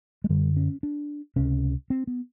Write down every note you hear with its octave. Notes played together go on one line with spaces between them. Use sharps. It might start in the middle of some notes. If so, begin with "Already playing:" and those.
G#3
F#2 D3 G3
C#4
D4
C#2 C3 C#4
C4
B3